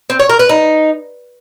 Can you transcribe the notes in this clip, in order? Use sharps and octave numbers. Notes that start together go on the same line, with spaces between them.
C4
C#5
A#4
B4
D#4